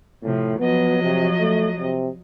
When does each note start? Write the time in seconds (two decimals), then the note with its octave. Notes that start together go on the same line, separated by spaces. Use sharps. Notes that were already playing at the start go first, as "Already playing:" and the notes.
0.23 A2 C3 F3
0.60 F3 F#3 B3 D#5
1.03 C3
1.40 A3
1.81 C3